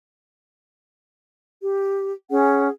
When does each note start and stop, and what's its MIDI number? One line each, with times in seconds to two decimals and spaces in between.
1.62 2.12 67
2.30 2.68 61
2.30 2.68 68
2.30 2.68 78